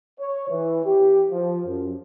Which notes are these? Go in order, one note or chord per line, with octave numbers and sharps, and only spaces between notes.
C#5
E3
G4
F3
F#2